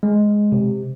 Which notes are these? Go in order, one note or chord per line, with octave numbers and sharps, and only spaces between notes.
G#3
C3